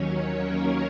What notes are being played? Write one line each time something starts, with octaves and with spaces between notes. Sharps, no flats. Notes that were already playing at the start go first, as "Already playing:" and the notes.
Already playing: D#2 D#3 F#3 C#4 C#5
A#3 A#4